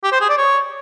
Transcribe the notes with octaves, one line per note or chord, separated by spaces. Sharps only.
G4
C5
G#4
D5
C#5